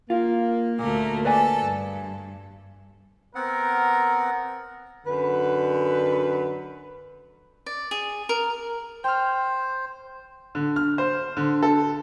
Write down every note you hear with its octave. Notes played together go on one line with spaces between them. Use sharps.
A#3 F4
D2 A#2 A3 A#4
A4 B4 D5 G#5
G2
B3 C4 A#4 F#5
F#2 D3 B4
D5
G#4
A#4
C5 G5 F6
D3
F6
C5
D3
A4